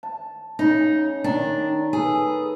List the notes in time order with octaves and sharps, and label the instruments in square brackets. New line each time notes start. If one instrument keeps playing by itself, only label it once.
[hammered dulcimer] A5
[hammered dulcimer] C#3 [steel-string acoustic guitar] D#4
[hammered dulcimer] D#3 [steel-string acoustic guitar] D4
[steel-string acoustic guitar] G#4 [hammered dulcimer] A4 B4